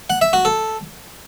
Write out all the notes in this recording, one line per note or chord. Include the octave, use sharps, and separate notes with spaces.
F#5
E5
F#4
A4